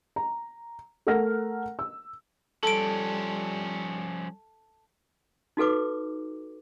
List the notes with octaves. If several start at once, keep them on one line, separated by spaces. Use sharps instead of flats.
A#5
A3 A#4 F#5 F6 A#6
E6
F3 G3 C#4 A4 A5 D7
D#4 F#4 A4 B4 D6